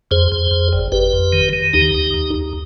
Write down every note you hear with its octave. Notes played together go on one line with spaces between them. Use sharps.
F2 G#4 C5
F2
F2
G1
G1 G4 B4
F2
D#3
D#3
D#2 D#4 G4
D#2
D#2
D#2